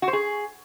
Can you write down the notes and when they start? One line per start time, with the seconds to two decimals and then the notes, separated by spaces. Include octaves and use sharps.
0.02 F#4
0.08 C5
0.13 G#4